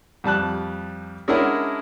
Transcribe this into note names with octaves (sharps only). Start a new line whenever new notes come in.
F2 G3 A5 F#6
G#3 C#4 D4 E4 A#4 F#5